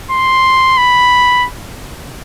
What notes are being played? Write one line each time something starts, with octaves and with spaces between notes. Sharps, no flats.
C6
B5